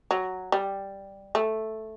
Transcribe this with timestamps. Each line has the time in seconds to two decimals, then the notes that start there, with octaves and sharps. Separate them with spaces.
0.11 F#3
0.52 G3
1.35 A3